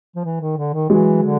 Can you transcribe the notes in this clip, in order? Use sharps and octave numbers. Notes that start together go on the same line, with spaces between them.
F3
E3
D#3
D3
D#3
E3 F#3 G#3
D3